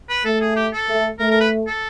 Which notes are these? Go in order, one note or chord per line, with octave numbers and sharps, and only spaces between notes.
B4
A3 A4
G#4
G4
A4
A3
A3 A#4
A#4
B4
A4